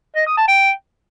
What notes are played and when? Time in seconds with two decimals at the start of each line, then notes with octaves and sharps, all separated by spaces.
0.16 D#5
0.26 D#6
0.37 A5
0.48 G5